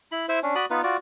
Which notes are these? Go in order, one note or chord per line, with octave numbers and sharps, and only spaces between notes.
E4 B5
E4 C5 E5
C#4 D4
F#4 D5 B5 D#6
B3 D#4 F4 B4
F4 F#4 D5